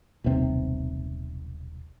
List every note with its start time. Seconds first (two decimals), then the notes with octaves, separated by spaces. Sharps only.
0.24 D#1 B1 C3 C4